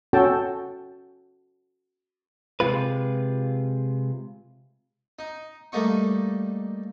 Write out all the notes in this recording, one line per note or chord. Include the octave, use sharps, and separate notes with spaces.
C#4 F#4 A4 G5 A5
C3 G#3 F4 B4
D#4
G3 A3 A#3 D#4 C#6